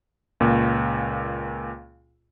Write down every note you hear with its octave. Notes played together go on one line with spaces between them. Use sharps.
C#2 A#2